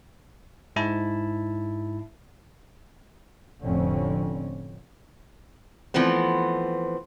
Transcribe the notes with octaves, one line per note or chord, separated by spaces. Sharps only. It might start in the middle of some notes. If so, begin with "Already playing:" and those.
G#2 E4 A5
F1 F2 A2 D3 C4 C#4
E3 F3 A3 B3 C4